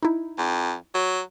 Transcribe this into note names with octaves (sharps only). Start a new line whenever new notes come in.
D#4 E4
F2
F#3